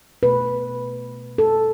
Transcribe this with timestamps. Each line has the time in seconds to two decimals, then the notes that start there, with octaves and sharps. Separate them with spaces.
0.23 B2 A3 B4
1.38 A4